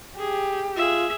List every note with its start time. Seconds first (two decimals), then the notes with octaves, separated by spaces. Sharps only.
0.19 G4 G#4
0.76 F4 G#4 E5